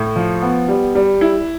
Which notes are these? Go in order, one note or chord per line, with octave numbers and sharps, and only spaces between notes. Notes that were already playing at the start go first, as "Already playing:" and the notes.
Already playing: A2
F3
B3
G3
G3
E4